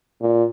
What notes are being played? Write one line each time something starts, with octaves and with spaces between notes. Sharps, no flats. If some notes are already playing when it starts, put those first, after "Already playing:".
A#2